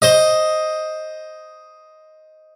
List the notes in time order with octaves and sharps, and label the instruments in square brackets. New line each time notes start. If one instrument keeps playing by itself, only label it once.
[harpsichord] C5 D#5